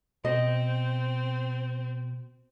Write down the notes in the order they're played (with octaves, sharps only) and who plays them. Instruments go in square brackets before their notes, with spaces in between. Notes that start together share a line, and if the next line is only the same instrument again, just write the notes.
[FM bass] B2 [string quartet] C4 [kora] D#5